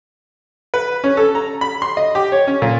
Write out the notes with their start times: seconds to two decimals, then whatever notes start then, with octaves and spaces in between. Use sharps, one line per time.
0.74 B4
1.04 C#4
1.17 A4
1.35 A#5
1.61 B5
1.82 C6
1.97 D#5
2.15 G4
2.32 C#5
2.47 C#4
2.62 A#2